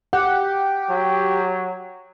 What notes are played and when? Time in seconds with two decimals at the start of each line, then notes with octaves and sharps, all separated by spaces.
0.13 G4 F#5
0.90 F#3